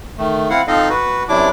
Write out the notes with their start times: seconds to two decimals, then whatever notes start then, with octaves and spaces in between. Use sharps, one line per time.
0.18 D#3 A3
0.50 C4 E4 F5 F#5
0.67 F3 C4 D#4 A4 D#5 F5
0.90 F#4 B4
1.29 F#2 C3 F#3 D4 E4 D6